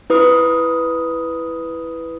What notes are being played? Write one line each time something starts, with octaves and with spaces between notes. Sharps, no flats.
E4 B4 D#6